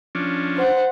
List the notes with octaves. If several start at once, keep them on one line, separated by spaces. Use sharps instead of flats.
F3 C#4 D4
C5 F#5